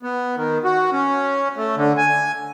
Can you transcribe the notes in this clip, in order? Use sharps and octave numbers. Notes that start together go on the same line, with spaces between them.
B3
D#3
F#4
C#4
A3
D3
G#5